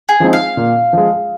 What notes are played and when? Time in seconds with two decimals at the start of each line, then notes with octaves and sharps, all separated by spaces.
0.09 G#4
0.20 F3 G#3 C4 D#4
0.33 F5
0.57 A#2
0.93 F3 G#3